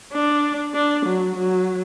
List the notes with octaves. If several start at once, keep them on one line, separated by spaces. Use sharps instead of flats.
D4
D4
F#3
F#3